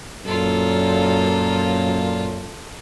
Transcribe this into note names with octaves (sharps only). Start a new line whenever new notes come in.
F#2 A#2 F4 A4